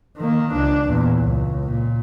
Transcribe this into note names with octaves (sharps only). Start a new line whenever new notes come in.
D#3 A#3
C#2 D4
E2 A#2
C#2
A#2